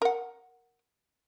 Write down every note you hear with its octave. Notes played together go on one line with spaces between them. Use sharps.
A#4 F#5